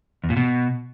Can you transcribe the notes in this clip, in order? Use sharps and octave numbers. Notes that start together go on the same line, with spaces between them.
E2
A#2
B2